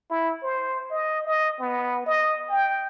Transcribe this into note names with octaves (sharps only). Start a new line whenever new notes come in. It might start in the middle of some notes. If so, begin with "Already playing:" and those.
E4
C5
D#5
D#5
B3
D#5
G5